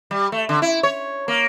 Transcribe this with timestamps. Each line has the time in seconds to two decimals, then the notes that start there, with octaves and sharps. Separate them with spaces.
0.11 G3
0.32 A3
0.49 D3
0.62 E4
0.83 C#5
1.28 A#3